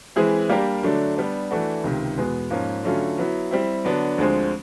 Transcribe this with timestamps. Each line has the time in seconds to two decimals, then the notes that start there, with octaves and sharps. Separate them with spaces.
0.16 E3 G#3 C4 E4 G#4
0.49 G3 A#3 D4 G4 A#4
0.83 D3 F#3 A3 D4
1.17 G3 B3 D4
1.51 E3 A3 D4 F#4
1.84 C#2 C3 D#3
2.17 E2 B2 G#3 B3
2.50 G#2 F3 A#3 C#4
2.84 D3 F#3 A3 C#4 F4
3.18 F#3 B3 E4
3.51 G3 C4 E4
3.85 D3 F#3 B3 D4
4.18 D2 D3 F3 G#3 C4